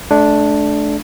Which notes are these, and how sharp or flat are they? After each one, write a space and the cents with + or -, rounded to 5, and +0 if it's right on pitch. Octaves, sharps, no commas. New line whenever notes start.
A3 -30 D4 +0